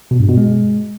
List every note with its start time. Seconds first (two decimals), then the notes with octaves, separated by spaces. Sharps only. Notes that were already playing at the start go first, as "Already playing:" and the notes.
0.11 B2
0.20 G2
0.29 B2
0.37 G#3